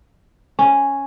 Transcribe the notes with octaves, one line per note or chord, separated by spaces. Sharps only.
C#4